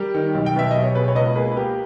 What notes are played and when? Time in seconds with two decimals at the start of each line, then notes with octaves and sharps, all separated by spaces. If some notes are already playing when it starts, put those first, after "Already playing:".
Already playing: G3 G4 A#4
0.14 D#3
0.34 B1
0.46 G5
0.56 B2 E5
0.71 B1 D#5
0.83 C#5
0.95 B2 G#4 B4
1.08 C#5
1.15 C#2 B4 D#5
1.36 A#3 G#4 B4
1.52 B4
1.56 A#3 G4 A#4